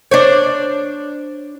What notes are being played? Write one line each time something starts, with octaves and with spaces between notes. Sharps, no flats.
D4 C5 C#5